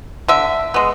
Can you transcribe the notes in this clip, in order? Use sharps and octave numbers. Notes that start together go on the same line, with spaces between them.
D3 E5
G#3 B3